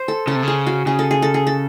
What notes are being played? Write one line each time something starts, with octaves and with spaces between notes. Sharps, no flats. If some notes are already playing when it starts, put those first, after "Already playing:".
Already playing: C5
A4
C#3 A4
C3
C#3 G#4
F#4
C#3 G#4
A4
G#4
A4
G#4
A4